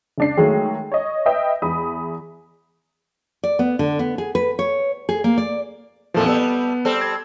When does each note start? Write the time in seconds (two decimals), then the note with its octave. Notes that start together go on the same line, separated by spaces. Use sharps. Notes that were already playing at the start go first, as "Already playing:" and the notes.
0.18 C#2 D4 C7
0.37 D#3 F#3 G#3 A3
0.92 C#5 D#5
1.26 B4 D#5 E5 G5
1.62 E2 B5 D#6
3.43 D5
3.59 B3
3.79 D3
3.99 B3
4.18 G#4
4.35 B4
4.59 C#5
5.09 G#4
5.24 A#3
5.38 D5
6.14 F2 A#2 E3 F3 A3 A4
6.26 G3 B3 A4
6.85 G3 C4 A4
7.01 G#6